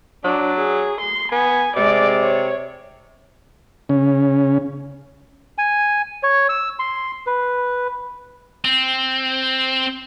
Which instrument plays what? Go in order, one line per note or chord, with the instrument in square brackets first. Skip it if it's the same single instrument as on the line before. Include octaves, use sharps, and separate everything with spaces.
[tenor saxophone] F#3 [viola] D4
[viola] G#4
C6
[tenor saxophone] B3 [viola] G#5
[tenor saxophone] C3 [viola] G#3 D5
[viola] C#5
[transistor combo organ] C#3 C#4
[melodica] G#5
C#5
E6
C6
B4
[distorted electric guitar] C4